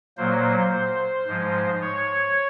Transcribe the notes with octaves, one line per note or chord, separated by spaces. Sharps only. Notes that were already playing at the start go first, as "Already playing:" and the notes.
A#2 F#3 A#3 C5
C5
G#2 F3 G#3
C#5